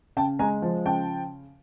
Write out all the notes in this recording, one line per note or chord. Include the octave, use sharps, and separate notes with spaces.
C#3 G5 A5
G#3 G#5 A#5
F3
C#3 G5 A5